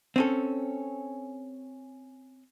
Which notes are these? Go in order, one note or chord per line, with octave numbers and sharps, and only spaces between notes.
C4 C#4 A4